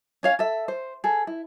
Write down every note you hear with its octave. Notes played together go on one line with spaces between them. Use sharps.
C#4 C#5 F5
A4 E5
C5
G#4 A4
E4